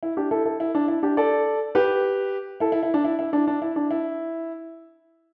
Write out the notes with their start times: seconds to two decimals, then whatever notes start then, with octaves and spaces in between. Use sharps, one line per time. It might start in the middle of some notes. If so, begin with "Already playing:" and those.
0.03 E4
0.17 D4 G4
0.31 E4 A4
0.46 E4 A4
0.60 E4
0.75 D4
0.88 E4
1.03 D4 G4
1.17 A4 D5
1.75 G4 B4
2.60 E4 A4
2.72 E4
2.83 E4
2.94 D4
3.05 E4
3.19 E4
3.33 D4
3.47 D4
3.62 E4
3.76 D4
3.91 E4